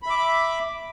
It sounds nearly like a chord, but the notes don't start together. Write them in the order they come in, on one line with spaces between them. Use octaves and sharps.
B5 E5 D6